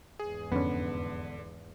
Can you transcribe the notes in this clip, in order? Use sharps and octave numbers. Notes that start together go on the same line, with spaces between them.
E2 G#2 G#4
F2 D3 B3 C#4